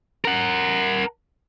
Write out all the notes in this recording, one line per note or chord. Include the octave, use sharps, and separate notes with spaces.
A#4 F#5